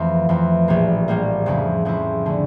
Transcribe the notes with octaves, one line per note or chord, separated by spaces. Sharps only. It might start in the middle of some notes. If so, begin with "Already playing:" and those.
Already playing: F2 E3 A3
F2 E3 A3
A#1 A2 G3 A#3
A#1 A2 G3 A#3
F2 C#3 F3 A3 E4
F2 C#3 F3 A3 E4
D3 A3 C#4